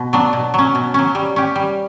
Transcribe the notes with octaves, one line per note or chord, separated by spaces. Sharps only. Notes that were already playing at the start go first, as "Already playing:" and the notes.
Already playing: B2
F#3 B3 D4
B2
F#3 C#4
B2
F#3 C#4
G3
C#4 G4
G3